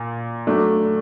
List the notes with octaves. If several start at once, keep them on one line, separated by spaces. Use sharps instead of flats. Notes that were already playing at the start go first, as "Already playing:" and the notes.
Already playing: A#2
F#3 A3 D4